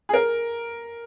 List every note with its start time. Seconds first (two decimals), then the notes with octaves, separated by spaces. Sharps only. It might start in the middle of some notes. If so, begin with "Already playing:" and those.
0.09 G#4
0.14 A#4